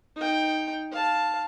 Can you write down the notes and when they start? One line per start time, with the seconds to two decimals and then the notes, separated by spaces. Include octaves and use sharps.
0.16 D#4 G5
0.91 F5 A5